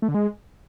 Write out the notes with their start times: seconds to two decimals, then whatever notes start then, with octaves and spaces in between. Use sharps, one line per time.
0.02 A3
0.08 D3
0.14 G#3